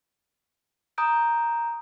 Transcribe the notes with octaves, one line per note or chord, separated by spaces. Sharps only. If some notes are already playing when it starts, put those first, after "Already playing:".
A#5 D#6 G6 D7